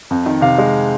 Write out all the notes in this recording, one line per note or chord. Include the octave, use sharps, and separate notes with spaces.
F2
D#3
C3 F5
G#3